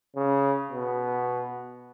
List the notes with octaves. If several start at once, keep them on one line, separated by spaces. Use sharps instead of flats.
C#3
B2